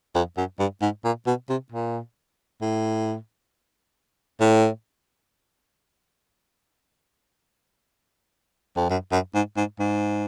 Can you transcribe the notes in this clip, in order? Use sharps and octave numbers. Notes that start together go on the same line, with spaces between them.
F2
F#2
G2
G#2
A#2
B2
C3
A#2
A2
A2
F2
F#2
F#2
G#2
G#2
G#2